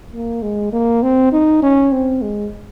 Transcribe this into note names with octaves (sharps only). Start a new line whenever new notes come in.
A#3
G#3
A#3
C4
D#4
C#4
C4
G#3